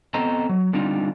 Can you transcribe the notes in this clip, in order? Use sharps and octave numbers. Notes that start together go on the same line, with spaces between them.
B3 C4 A4 C5 D#5 A#5
F#3
D3 G3 C4 D4 D#4 F4